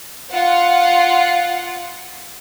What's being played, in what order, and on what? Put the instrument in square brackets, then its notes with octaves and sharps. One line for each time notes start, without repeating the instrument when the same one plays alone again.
[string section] F4 F#5